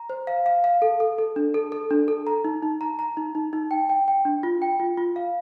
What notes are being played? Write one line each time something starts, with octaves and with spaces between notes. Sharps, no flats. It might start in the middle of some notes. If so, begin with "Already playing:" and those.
Already playing: A#5
C5
F5
F5
F5
A4
A4
A4
D4
A4
A4
D4
A4
A#5
D#4
D#4
A#5
A#5
D#4
D#4
D#4
G5
G5
G5
D4
F4
G5
F4
F4
F5